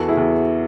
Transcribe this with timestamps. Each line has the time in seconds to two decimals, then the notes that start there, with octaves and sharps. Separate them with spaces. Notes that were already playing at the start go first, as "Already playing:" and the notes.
Already playing: E2 F#4 A4
0.08 E4 G#4
0.17 E2